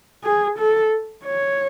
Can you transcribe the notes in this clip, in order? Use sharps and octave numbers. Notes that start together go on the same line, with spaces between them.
G#4
A4
C#5